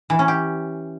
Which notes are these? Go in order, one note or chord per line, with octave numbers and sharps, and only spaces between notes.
E3
C#4
G4